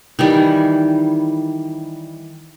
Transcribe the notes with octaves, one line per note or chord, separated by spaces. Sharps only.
D#3 E3 G3